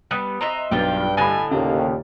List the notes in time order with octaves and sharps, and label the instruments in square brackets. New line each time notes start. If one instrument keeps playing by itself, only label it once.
[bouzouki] G3 B3 [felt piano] D#6 F#6 D#7
[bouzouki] C4 D#5 E5 [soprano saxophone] A#5
[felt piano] B1 [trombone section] G2 [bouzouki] F3 G3 F4 [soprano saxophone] G5
[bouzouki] A2 D3 D#5 [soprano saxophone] G#5 [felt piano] B5 A6
[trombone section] D#2 A#2 [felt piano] C#3 G4 [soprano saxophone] A#3